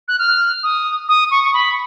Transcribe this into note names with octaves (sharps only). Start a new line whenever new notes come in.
F#6
F6
D#6
D#6
C#6
C#6
B5